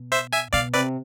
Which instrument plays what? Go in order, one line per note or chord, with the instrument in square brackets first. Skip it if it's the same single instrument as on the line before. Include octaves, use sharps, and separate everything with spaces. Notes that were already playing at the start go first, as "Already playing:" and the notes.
Already playing: [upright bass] B2
[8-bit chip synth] C5 E5
E5 G#5
[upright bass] B2 [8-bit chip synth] D5 F5
[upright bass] C3 [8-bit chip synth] B4 D5